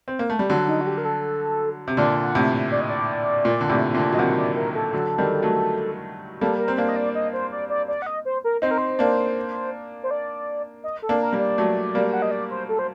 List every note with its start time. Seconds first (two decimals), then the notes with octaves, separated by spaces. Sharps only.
0.08 C4
0.19 A#3
0.30 A3
0.39 G3
0.50 D3 F#3
0.68 D#4
0.81 F#4
0.87 G4
0.98 A#4
1.05 A4
1.88 C3
1.97 A#2 D3 D5
2.23 F#5
2.35 A2 C3
2.71 D5
2.81 D#5
2.90 D5
3.45 A#2
3.61 D3
3.69 A2 C3
3.94 A#2 D3
4.13 F#3 D#5
4.19 C3 D#3 F#5
4.38 D5
4.56 A#4
4.75 A4
4.93 D3 F#3
5.18 D#3 G3
5.42 F#3 A3
6.41 G3 A#3 A4
6.59 A#4
6.68 C4
6.77 A#3 D4 C5
6.89 D#5
6.96 D5
7.15 D#5
7.33 C5
7.52 D5
7.70 D5
7.88 D5
8.02 F#5
8.06 D#5
8.25 C5
8.44 A#4
8.62 C4 D#4 C5
8.71 A#4
8.78 C5
8.99 A#3 D4
10.03 C5
10.11 D5
10.84 D#5
11.02 A4
11.09 A#3 D4
11.21 A#4
11.33 G3 A#3
11.39 D5
11.58 F#3 A3
11.95 G3 A#3
12.13 F#5
12.22 D#5
12.31 D5
12.50 C5
12.69 A4
12.79 C5